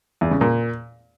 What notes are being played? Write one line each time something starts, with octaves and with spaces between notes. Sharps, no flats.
E2
C#3
A#2